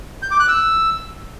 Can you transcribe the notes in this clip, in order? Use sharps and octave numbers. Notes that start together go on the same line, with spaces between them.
G6
D6
F#6
E6